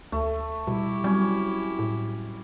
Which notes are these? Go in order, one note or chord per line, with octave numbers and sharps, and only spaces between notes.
D2 A3
B2 G3 E4 G4
F#3 G3 C4 C#4 G#5
A2